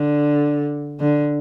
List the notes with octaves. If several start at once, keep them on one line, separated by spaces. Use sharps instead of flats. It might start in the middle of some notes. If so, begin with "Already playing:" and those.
Already playing: D3
D3